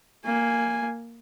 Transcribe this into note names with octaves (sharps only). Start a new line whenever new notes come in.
A#3 G#5